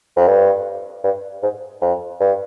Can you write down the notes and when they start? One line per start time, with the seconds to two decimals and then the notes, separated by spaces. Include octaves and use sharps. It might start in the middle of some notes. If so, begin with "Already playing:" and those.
0.16 F2
0.28 G2
1.04 G2
1.43 G#2
1.81 F2
2.20 G2